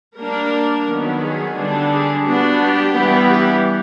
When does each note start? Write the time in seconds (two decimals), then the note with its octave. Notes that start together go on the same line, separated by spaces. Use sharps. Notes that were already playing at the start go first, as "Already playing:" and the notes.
0.17 G3 A#3 D4 A#4
0.86 D#3 F#3 B3
1.21 G#4
1.55 D3 G3 B3 D4
1.90 G#4
2.25 G3 B3 D4 F#4
2.59 G4
2.94 E3 G3 B3
3.29 G4